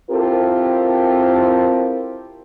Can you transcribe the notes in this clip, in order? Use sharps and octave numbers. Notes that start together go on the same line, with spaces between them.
C4 E4 F4 G4 A4 A#4